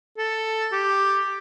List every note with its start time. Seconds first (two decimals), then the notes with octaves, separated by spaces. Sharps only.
0.17 A4
0.72 G4